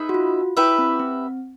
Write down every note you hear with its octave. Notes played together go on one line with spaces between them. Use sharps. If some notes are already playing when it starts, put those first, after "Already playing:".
Already playing: D#4 G#4 B4 E5
F#4
F4
E4 G4 B4 E5
C4
C4